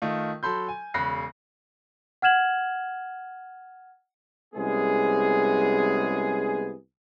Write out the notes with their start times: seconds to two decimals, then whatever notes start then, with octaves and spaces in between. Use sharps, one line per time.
0.02 D#3 A3 F4
0.43 F#3 A4 B5 C6 G6
0.68 G#5
0.94 E1 C#3 B5 F#6 A#6 C7
2.22 F#5 F6 G#6 E7 F#7
4.55 C2 G#3 B3 C#4 G#4